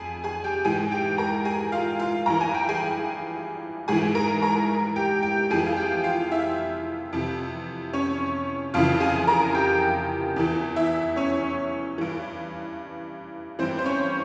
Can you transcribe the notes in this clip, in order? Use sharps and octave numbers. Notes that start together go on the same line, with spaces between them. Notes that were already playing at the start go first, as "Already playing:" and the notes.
Already playing: F2 G#4 G#5
G#4 G#5
G4 G5
G#2 E3 G#4 G#5
G4 G5
A#4 A#5
G#4 G#5
F4 F5
F4 F5
G2 E3 A#5
G#5
G5
G#4 G#5
G#2 E3 G#4 G#5
A#4 A#5
A#4 A#5
G4 G5
G4 G5
F2 E3 G#4 G#5
F5
G4 G5
F4 F5
E4 E5
F2 C3 E3
C#4 C#5
F2 C#3 E3 F4 F5
G#4 G#5
A#4 A#5
G4 G5
E2 E3
E4 E5
C#4 C#5
G2 E3
G2 E3 C4 C5
C5
C#4 C#5